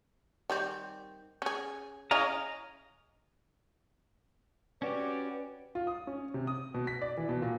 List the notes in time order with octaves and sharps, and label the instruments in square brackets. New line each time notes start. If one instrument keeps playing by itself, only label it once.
[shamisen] D#3 G3 C4
C#4 G#4
[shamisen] C#4 E4 G#4 [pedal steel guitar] D#5 F5 A#5
[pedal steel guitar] C#4 F#4 G4 [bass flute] B4 [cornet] D5
[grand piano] F4
D#6
C#4
C3
D#6
B2
B6
D5
E3
B2
A#2